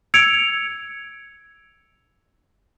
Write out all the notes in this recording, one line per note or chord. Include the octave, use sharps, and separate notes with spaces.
E6 G#6 C#7 D7 F7